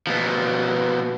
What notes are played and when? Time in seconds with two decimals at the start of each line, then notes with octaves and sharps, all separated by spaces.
0.07 B2 F3